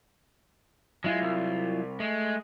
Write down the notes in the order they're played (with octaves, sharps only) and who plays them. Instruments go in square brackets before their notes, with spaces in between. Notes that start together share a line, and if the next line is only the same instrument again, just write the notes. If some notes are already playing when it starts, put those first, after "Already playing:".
[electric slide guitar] F#3 E4 F4 [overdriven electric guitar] G#3
[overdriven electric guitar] C2
[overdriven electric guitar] G#3 [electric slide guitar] A3